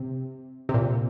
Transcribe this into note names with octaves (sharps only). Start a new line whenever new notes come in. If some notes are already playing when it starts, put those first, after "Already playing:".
Already playing: C3
C3
A#2